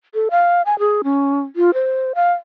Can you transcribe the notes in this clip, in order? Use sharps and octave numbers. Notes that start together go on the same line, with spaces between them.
A4
F5
G#5
G#4
C#4
F4
C5
F5